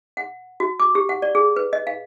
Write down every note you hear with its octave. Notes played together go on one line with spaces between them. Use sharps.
F#5
F#4
D6
G4
F#5
D5
G#4
B4
D#5
F5